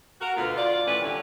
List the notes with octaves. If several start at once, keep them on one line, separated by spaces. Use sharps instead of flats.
F#4 A#4
D2 B2 B3 F4
F4 D5
A2 E3 C#4 B4
D3 G3 C#4